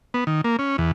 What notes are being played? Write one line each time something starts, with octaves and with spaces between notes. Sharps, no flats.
B3
D#3
A#3
C#4
E2